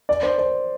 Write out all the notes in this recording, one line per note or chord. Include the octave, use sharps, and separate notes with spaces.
D5
C5
C5